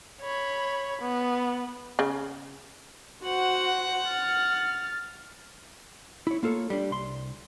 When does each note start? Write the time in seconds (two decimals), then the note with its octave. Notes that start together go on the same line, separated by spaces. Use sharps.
0.22 C#5 B5
1.01 B3
1.99 C#3
3.25 F#4 C5 F#5
4.09 F6 A6
6.27 E4 C#5
6.43 A#3 F4 A4 C5 C#5
6.70 G3 D4
6.91 C2 C6